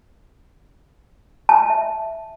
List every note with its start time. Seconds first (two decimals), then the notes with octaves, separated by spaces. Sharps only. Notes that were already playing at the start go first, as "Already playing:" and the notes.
1.49 A5
1.70 E5